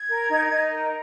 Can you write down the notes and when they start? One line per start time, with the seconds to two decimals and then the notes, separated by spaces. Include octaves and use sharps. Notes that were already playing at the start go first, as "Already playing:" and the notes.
Already playing: G#6
0.08 A#4
0.29 D#4
0.50 D#4
0.71 A#4